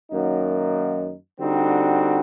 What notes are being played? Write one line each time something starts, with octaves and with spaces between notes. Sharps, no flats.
F#2 D#3 F#3 A#3 D#4
D3 G3 C4 D#4 F#4